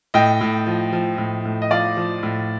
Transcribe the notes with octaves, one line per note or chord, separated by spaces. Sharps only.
A2 D#5 G5
A2
F3
F3
A2
A2
D#5
F3 D5 F5
F3
A2